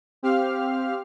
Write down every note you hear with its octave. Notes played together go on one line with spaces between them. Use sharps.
C4 G4 F5 F6